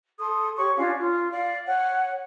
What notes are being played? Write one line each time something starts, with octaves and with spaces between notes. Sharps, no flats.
A4 C6 D#6
G4 C#5 C#6
C#4 D4 F4 F5
F4
D5 F5
C#5 F#5